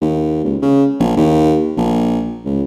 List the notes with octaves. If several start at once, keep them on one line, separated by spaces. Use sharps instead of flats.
D#2
C#2
C#3
A#1
D#2
A#1
C#2